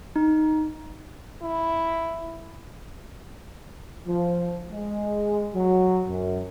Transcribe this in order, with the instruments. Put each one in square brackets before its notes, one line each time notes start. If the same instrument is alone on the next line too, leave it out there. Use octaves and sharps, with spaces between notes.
[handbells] D#4
[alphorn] E4
[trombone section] F3
G#3
F#3
F#2